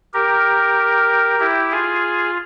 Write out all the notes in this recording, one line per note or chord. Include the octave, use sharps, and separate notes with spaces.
G4 A#4
E4 G4
F4 G#4